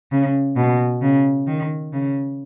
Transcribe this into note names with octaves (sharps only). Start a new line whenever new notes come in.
C#3
B2
C#3
D#3
C#3